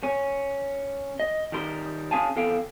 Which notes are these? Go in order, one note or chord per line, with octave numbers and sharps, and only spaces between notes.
C#4
D#5
D#3 G3 A#4 C6
C#4 G#4 F5 G#5 A5
E2 A4 F5 G5